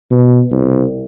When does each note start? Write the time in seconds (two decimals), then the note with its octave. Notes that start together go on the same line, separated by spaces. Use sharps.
0.11 B2
0.51 C2